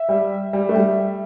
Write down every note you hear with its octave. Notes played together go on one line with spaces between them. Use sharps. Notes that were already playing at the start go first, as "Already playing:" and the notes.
Already playing: E5
G3
G3
A3
G3